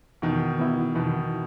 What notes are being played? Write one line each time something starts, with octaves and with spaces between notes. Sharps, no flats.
B2 D#3 E3
B3 E4
B2 D#3 E3